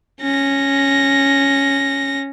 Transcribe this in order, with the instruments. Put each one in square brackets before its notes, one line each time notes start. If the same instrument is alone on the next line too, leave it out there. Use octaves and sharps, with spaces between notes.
[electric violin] C#4 A#6